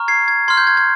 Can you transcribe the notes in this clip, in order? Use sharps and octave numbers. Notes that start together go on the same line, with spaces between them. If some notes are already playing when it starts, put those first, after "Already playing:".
Already playing: A#5 C#6 F6
G#6 C7
G#6
C6 F6 G#6
G6
G#6
G#6